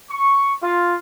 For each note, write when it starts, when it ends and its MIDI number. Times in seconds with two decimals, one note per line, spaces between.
0.11 0.54 85
0.62 0.95 65